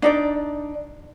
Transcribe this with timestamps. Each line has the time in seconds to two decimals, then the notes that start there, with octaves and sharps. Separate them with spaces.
0.02 D4 D#4 D5